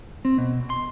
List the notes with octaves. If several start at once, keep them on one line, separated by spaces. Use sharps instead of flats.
C4
B2
C6